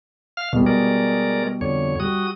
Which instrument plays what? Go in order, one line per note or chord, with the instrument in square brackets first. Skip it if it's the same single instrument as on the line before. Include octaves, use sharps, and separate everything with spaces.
[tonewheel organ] F5 F6
[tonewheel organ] E2 [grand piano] B2 G3
[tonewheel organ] G#3 A#4 D5
F2 D3 C#5
[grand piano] G3 [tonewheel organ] F#4 D#6